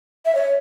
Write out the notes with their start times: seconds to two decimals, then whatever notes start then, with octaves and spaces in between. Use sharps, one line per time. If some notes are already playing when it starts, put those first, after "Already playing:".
0.25 E5
0.35 C#5